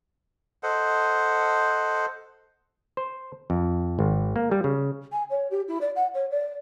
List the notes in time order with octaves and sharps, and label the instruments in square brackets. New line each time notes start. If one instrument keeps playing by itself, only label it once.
[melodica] A4 C5 D#5 F#5
[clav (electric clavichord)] C5
F2
G#1
A#3
G3
C#3
[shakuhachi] G#5
C#5
G4
E4
D5
F#5
C#5
D5